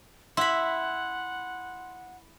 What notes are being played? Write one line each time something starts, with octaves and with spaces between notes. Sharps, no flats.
E4 F#5 B5 C6